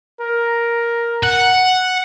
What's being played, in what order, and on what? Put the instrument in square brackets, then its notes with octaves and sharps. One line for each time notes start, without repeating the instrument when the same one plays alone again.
[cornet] A#4
[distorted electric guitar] F#5